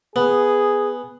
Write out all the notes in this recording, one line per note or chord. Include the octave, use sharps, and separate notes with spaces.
B3 G#4